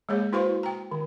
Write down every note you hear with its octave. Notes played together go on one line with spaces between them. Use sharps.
G#3 A#3 G#4 C#5
E4 F#4 B4 C5 F5 C#6
G5 A#5
D#3